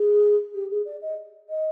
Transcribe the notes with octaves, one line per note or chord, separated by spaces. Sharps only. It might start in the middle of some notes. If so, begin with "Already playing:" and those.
Already playing: G#4
G4
G#4
D5
D#5
D#5